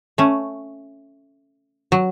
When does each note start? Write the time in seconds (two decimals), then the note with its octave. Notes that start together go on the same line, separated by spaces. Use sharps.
0.18 A3 C#4
1.92 F#3